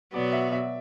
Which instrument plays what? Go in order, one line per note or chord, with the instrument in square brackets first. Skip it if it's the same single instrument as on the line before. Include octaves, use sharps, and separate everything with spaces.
[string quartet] B2 F#3 B3 F#4 [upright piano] D5
[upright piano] E5
E5